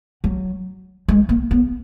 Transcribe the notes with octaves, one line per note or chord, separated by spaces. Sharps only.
F#3
G#3
A#3
B3